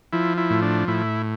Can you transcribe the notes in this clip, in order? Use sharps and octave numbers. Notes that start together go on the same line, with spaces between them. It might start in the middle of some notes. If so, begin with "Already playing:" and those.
F3 E4
E4
A2
D4
A2 E4